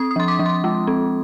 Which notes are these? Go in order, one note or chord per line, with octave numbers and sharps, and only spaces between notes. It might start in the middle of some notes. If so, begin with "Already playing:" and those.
Already playing: C4 D#6
D#6
F3 C6
D6
F3
C6
G#3
C4